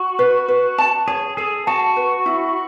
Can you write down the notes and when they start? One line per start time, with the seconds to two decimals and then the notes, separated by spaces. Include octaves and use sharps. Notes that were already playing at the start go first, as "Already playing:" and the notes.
Already playing: F#4
0.19 B4
0.48 B4
0.78 A5
1.08 G#4 C#5
1.37 G#4 A4
1.67 F#4 A5
1.96 B4
2.26 E4